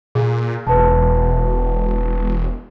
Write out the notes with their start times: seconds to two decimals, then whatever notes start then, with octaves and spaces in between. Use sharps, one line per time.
0.15 A#2 G#4
0.67 E1 B4 A5